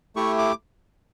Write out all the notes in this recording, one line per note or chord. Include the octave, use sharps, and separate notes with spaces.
A3 E4 G4 C#6
D6